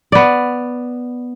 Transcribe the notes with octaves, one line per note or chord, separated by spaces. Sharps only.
B3 D5